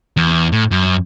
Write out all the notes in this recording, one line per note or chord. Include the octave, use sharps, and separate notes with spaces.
E2
A2
F#2